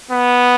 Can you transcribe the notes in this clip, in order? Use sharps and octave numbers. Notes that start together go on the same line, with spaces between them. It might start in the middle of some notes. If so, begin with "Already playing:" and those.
B3